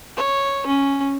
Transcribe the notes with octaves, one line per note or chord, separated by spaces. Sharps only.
C#5
C#4